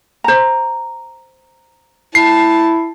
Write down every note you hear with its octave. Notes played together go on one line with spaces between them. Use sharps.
C5 A#5
E4 A5 C7